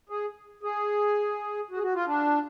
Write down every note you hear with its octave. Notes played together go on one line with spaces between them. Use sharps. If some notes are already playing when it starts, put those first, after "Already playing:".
G#4
G#4
F#4
G#4
F#4
F4
D4